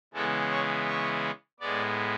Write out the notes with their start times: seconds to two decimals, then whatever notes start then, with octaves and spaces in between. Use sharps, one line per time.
0.14 C#3 E3 G#3 B3 A4
0.50 C#5
0.87 C#5
1.60 A2 G#3 B3 D5